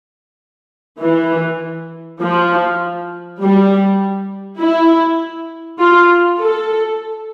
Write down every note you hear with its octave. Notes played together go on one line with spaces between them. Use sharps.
E3
F3
G3
E4
F4
A4